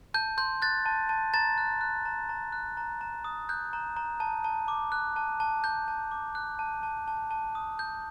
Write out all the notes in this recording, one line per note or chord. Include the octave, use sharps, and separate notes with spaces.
A5 G6
C6 G6
F#6 A6
A5
A5
A#5 A6
F#6
F#6
A#5
A#5
F#6
A#5
A#5
D#6
F#6 G6
A#5
A#5
A5
A5
D6
F#6
A5
A5
A5 G6
A5
D6
F#6
A5
A5
A5
A5
D#6
G6